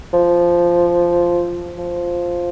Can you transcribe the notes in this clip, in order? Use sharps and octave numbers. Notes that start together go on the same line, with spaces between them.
F3
F3